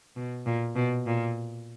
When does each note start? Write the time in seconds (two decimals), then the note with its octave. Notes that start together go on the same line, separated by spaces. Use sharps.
0.16 B2
0.46 A#2
0.76 B2
1.07 A#2